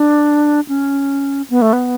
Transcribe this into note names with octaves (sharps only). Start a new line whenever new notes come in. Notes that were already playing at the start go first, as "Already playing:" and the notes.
Already playing: D4
C#4
B3
A3
B3